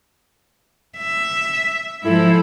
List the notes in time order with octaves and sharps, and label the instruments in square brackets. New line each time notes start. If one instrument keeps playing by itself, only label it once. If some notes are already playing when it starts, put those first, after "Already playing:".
[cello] E5
[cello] G#2 F3 [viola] E4 A4